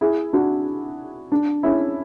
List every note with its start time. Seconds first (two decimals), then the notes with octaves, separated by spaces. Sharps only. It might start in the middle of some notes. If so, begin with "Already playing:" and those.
0.01 E4 G#4
0.33 D4 F#4
1.32 D4
1.63 C#4 E4